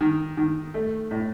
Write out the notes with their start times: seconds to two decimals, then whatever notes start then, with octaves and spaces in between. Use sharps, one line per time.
0.01 D#3
0.37 D#3
0.74 A3
1.11 A2